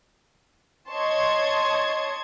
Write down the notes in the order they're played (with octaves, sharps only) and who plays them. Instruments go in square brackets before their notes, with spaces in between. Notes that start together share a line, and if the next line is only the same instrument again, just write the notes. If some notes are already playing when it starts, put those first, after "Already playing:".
[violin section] C#5 D#5 A5 C6 C#6 G#6